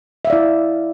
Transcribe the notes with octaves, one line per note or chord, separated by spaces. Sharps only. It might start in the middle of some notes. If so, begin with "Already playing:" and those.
E4 D5 E5 F5